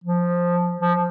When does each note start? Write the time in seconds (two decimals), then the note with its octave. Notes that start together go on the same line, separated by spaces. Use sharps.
0.04 F3
0.80 F3